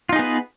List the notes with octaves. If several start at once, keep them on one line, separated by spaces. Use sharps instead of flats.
B3 D#4 F4 G#4 B4